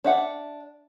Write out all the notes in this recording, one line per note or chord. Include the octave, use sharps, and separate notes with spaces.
D4 E5 F#5